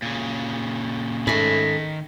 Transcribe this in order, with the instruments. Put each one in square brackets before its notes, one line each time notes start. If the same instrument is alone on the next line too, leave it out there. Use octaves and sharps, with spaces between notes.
[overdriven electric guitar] A#2 C#3
[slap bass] G#2 [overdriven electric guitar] D#3 B5 [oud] A3 C#4